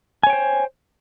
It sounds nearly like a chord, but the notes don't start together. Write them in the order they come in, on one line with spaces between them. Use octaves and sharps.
G#5 C#5 G5 C5